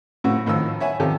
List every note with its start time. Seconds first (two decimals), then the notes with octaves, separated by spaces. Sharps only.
0.24 F2 A2 C#3 A3 F#4
0.46 A2 D#3 F3 E6
0.80 C#5 E5 F#5 G#5
1.00 C3 D#3 F3 G4 A4